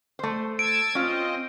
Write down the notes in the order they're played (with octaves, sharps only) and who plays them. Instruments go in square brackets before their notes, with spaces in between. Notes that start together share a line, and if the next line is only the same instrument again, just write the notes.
[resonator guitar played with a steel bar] A3 C5
[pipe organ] A5 E6 G#6 [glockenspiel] D7
[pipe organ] C4 C5 D#5 [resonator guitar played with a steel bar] C#4 F4